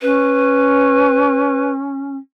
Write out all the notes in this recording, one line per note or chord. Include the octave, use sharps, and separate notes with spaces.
C#4 B4